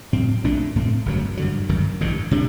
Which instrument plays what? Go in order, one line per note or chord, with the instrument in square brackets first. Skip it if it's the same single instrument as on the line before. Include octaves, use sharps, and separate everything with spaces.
[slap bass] A2 F#3 C4
A#1 A#2 A3 D4
A2 A3 C4
G1 F#2 D3 F#3
G2 D3 F#3
G1 F#2 D#3
A1 G2 D3
C3 G3 D4